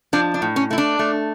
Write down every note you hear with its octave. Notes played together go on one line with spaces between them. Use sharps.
F3 D4
D4
A2
C#4
A3 E4
D4
A3